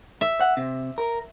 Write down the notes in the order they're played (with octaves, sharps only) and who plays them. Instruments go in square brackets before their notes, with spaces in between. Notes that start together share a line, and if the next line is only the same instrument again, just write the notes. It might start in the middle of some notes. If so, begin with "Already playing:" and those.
[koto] E5
[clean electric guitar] F#5
C3
A#4